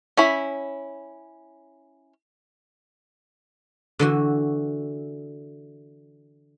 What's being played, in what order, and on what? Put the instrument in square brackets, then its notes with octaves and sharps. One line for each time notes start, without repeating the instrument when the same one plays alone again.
[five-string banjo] C#4 E4 B5
[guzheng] D3 E3 F#4